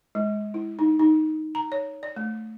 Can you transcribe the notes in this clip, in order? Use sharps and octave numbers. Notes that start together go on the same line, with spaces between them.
G#3
E4
D#4
D#4
A#5
C#5
D5
A3